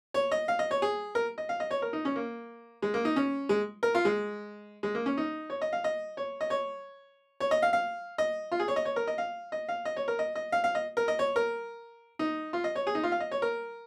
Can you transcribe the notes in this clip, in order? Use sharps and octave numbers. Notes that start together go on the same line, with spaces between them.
C#5
D#5
F5
D#5
C#5
G#4
A#4
D#5
F5
D#5
C#5
A#4
D#4
C#4
A#3
G#3
A#3
D#4
C#4
G#3
A#4
F4
G#3
G#3
A#3
C#4
D#4
C#5
D#5
F5
D#5
C#5
D#5
C#5
C#5
D#5
F5
F5
D#5
F4
G#4
C#5
D#5
C#5
A#4
D#5
F5
D#5
F5
D#5
C#5
A#4
D#5
D#5
F5
F5
D#5
A#4
D#5
C#5
A#4
D#4
F4
D#5
C#5
G#4
D#4
F4
F5
D#5
C#5
A#4